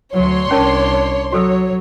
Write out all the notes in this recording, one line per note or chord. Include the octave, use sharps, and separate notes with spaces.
D2 F#3 C#5 C6
C2 C#4 D4 A#4 A5
F#3 F#4 A4 C#5 E6